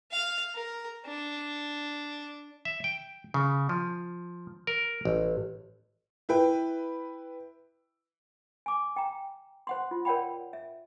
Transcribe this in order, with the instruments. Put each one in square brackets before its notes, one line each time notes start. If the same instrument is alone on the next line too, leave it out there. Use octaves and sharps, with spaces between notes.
[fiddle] F5
A#4
D4
[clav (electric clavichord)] E5
G5
C#3
F3
A#4
A1
[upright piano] E4 B4 G5
[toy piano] G#5 D6
G5 A#5
C5 F#5 C6
F4
A#4 C#5 D5 F#5 G5 B5
E5